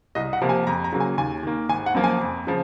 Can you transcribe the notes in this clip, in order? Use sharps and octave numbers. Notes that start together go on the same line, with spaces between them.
C2 D#5
F#5
C3 F3 A#3
G#5
F2 A#5
A#5
C#3 F#3 A#3
G#5
D#2 G#5
D#3 A#3
G#1 G#5
F#5
F#2 F3 A#3
G#5
F2
C#3 F3